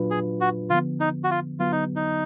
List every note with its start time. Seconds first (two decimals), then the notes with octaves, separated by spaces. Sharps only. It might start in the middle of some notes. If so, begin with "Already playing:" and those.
Already playing: A#2 F#3 D4 F4 B4
0.11 G#4
0.40 F#4
0.70 D3 F3 B3 F4
1.00 D#4
1.24 F#4
1.31 F4
1.60 D3 F#3 B3 F4
1.72 D#4
1.96 D#4